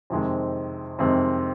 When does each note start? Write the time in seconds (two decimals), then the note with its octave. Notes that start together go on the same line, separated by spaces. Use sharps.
0.10 F2 C3 D#3 G#3 C4
0.99 F2 C3 D#3 G#3 C4